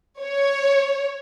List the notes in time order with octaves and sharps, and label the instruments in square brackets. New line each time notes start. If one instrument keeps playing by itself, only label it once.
[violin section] C#5